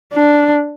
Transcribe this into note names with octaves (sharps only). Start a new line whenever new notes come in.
D4